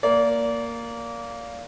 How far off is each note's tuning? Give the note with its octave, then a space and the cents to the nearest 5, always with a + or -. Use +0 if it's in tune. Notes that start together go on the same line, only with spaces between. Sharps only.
A#3 +0 D5 -25